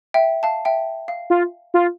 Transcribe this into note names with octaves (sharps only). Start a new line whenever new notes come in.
E5 G5
F5 A5
E5 G5
F5
F4
F4